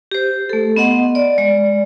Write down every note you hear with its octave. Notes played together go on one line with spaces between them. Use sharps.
G4 C5
A3 A4
B3 D#5 F#5 C6
D5
G#3 D5